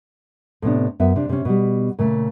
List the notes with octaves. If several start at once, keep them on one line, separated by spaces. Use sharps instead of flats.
A2 C3 B3 D4
F#2 B3 E5
C3 D4
C3 C#4
B2 G3
A#2 C#3 A3